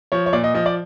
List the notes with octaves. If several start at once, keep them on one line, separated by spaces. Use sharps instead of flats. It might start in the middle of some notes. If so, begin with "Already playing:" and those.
F3 C#5
C#5
A#2 D5
D#5
F3 D#5
D5